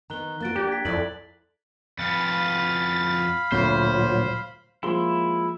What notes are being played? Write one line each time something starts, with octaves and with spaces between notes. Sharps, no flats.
D#3 B3 A#5 F#6 G7
A#3 B3 F#4 F#6 A6 D7
A#3 D4 G4
G#6 B6
F2 E4 A4 D5 F#7
F2 B3 F5 B5 A6
D2 A#2 F#3 C5
F3 G#3 A#3 E4 C6